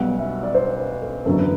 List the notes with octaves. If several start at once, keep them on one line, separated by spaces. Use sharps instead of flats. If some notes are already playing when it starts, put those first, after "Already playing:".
Already playing: B1 B2 G3 F#5
E5
D5
C5
B4
A4
F#1 E2 D3 F#3 A4
B4